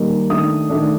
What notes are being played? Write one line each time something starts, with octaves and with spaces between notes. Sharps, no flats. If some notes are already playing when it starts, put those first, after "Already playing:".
Already playing: D#3 G3 A#3 D#4
D#3 A3 D4 D#6
D#3 A3 D4